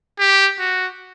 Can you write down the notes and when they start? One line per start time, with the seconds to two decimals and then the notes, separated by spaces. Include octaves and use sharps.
0.19 G4
0.59 F#4